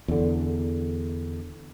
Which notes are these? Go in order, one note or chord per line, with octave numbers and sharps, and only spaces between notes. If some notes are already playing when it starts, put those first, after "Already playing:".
E2 D3